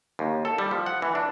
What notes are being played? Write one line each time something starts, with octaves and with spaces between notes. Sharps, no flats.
D#2
A4
G3
F3
F#5
E3
D4